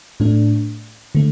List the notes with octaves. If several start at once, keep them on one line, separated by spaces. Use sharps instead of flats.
A2 A3 D4
D3 A3